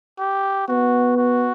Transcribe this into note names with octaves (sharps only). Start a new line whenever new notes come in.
G4
B3 F#4
F#4